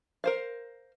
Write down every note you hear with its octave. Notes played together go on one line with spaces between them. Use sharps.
A#4 C5 F5